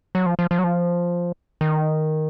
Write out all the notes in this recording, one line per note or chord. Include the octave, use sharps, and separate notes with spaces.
F#3
F3
F3
F3
F#3
F3
D#3